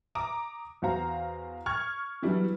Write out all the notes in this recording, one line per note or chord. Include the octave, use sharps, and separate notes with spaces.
A#5 D6 D#6
E2 F#4 C5 F5 A#5
C#6 F6 G#6
E3 F#3 G3 B3 D4 E4